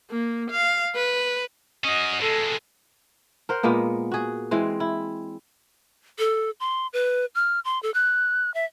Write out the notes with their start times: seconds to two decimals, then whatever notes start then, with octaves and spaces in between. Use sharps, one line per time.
0.11 A#3
0.51 F5
0.95 B4
1.84 C#4 F#4 D#5
2.21 B2 G#3 A4
3.49 A#4 C5 F#5
3.63 A#2 G#3 A#3 B3
4.12 F#4 G#4
4.51 E3 G#3 C4
4.80 E4
6.19 A4
6.60 C6
6.93 B4
7.35 F6
7.65 C6
7.83 A4
7.94 F#6
8.54 E5